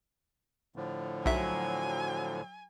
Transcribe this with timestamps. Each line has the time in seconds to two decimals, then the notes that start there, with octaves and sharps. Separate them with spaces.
0.76 A2 D3 F3
1.26 B1 F#3 E5 G#5